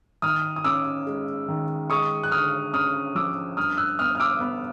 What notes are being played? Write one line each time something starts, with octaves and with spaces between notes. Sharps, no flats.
D#3 D#6 F6
D#6
C#4 D6 E6
G#3
D#3
G#3 C#6 D#6
F#6
D3 D#6 F6
C#4 D#6 F6
F3 D6 E6
G2 D#6 F6
E6 F#6
B3 D#6 F6
F6
D6 E6
B3